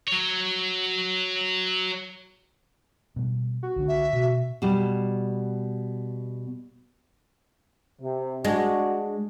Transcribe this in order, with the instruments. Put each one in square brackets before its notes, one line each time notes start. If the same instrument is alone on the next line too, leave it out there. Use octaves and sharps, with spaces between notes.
[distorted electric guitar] F#3 C#5
[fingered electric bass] B2 G3
[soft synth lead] F#4
[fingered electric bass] C2 D3 D4
[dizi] E5
[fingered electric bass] B2
[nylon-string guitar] B2 G3
[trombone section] C3
[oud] G#3 [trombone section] D4 F#4